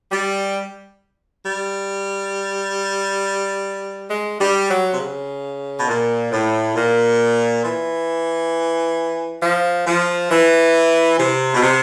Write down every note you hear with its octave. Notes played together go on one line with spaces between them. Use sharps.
G3
G3
G#3
G3
F#3
C3
C#3
B2
A#2
A2
A#2
E3
F3
F3
E3
C3
B2
C3